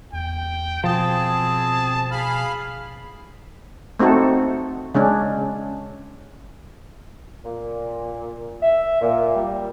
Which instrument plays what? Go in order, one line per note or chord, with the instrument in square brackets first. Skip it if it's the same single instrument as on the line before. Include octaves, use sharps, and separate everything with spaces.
[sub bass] E2 [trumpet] G5
[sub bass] B2 [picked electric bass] F3 [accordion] C4 G#4 [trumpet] A5
[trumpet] G#4 [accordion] F5 B5 F6
[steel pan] A3 C4 D#4 F#4 A4
C#3 G#3 C#4 D4
[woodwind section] A#2
E5
A#2
G3